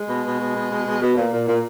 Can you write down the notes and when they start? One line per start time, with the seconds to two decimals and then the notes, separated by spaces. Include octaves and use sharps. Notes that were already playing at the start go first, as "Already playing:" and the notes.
Already playing: G#3
0.09 B2
0.25 B2
0.40 B2
0.55 B2
0.71 B2
0.85 B2
1.02 B2
1.17 A#2
1.32 A#2
1.48 A#2